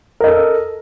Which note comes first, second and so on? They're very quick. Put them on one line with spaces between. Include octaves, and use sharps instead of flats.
A#4 D#5 A4